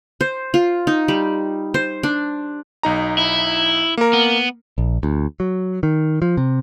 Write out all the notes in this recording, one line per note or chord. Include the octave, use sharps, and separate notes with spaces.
C5
F4
D#4
G3
C5
D4
B1 D#4 A#5
E4
A#3 A#4
B3
A#1
D2
F#3
D#3
F3
C3